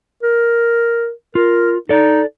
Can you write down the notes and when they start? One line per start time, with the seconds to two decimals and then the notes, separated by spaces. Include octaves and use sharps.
0.23 A#4
1.35 F4 A#4
1.89 D#4 A4 D5